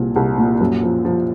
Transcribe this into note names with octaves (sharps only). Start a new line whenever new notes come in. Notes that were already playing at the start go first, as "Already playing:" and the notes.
Already playing: C2 A#2 F3
C2
A#2
F#2
F3
F3